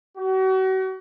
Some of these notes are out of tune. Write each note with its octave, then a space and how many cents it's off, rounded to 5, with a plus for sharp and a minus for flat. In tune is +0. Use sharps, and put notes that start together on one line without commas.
F#4 +40